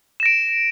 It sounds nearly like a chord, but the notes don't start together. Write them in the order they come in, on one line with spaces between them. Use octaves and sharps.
E7 A#6 D7